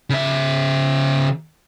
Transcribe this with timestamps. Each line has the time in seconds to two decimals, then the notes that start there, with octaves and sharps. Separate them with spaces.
0.10 C#3 E5